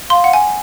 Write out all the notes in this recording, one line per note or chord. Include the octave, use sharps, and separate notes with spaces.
F5 C6
F#5
G#5